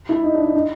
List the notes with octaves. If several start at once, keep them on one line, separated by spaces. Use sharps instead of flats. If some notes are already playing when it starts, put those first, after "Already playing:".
E4
D#4
D4
D#4
D#4